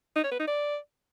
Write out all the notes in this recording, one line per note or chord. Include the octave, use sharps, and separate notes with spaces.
D#4
C#5
B4
D#4
D5